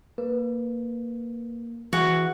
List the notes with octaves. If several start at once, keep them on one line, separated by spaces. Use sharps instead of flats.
A#3 B4
E3 F#4 G#4